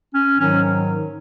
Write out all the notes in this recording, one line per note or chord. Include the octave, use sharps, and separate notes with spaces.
C#4
G#2 D#3 F#3 C#4